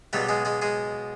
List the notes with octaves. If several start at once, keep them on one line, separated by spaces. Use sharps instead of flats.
C#2 B2 F#3 G3 G4
G#3 G#4
G#3 G#4
G#3 G#4